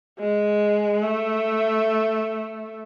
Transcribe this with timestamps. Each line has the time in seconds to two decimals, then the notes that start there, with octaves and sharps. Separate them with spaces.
0.20 G#3
1.03 A3